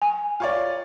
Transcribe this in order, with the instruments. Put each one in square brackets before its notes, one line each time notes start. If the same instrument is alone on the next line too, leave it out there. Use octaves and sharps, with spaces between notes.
[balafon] G#5
[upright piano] F4 C#5 D5